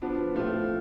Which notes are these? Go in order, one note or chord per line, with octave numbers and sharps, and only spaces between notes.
F3 B3 D4
A2 F3 A3 C4 F4